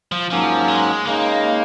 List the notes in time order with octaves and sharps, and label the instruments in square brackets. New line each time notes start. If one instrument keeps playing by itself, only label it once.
[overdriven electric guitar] F3
[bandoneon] G#2 F#3 A#3 C#4 [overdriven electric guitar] F3
[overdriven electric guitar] G#3
[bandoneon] C#3 G#3 D#4 [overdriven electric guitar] A#3